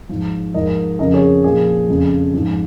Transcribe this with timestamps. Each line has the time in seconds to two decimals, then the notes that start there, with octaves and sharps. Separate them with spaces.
0.09 G#2 F3
0.54 G#2 F3 A#4 D#5
0.99 F2 C#3 F3 A#4 D#5
1.14 G#4 C#5
1.44 A#2 F3 G#4
1.89 F2 C#3 F3
2.34 G#2 F3